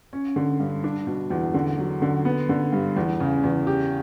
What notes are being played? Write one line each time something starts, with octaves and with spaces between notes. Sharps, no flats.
C#4
D3
G2
D4
B2
E2
D3
F#3
D3
B3
D3
G2
E2
C#3
E2
G4